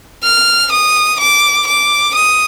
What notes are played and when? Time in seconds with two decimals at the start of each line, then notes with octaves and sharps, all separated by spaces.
0.24 F6
0.72 D#6
1.20 D6
1.67 D6
2.14 D#6